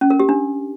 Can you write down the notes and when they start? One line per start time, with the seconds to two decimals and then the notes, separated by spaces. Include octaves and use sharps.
0.01 C#4
0.10 A#4
0.20 G4
0.29 D4